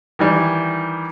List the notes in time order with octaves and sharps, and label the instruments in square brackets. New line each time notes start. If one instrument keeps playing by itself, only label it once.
[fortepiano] D#3 E3 G3